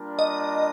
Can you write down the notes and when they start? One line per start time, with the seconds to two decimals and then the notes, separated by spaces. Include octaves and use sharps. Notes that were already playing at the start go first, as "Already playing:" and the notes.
Already playing: G3 A#3 D4 F4 A#4
0.19 D#5